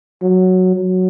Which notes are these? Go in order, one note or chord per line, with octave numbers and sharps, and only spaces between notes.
F#3
F#3